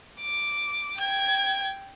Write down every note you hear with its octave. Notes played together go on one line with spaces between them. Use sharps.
D6
G5 G#6